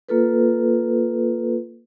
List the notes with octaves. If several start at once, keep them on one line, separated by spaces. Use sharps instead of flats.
A#3 F4 A4 B4